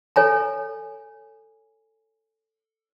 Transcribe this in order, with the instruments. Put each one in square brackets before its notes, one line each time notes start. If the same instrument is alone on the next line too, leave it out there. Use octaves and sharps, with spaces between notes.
[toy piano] A4 C#5 G#5 A#5